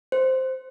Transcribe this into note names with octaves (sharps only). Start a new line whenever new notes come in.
C5